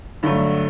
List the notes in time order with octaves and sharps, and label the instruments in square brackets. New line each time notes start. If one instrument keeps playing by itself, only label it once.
[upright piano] G2 D3 F#3 A3